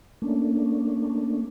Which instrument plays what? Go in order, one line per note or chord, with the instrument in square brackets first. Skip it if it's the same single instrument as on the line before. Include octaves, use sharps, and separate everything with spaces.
[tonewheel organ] A3 A#3 C#4 D4